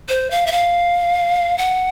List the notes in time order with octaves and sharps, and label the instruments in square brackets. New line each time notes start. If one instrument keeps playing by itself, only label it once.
[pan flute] C5
F5
E5
F5
F#5